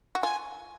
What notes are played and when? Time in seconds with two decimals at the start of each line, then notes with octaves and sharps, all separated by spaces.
0.15 F#4
0.22 F4 G#5